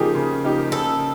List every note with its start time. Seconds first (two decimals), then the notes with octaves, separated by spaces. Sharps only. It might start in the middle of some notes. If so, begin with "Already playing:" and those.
Already playing: C#3 F3 A#3 D#4 G4 G#4
0.15 C#3
0.44 F3 A#3 D#4 G4
0.72 C#3 A4